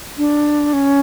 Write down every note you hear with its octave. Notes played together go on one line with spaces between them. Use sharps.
D4
C#4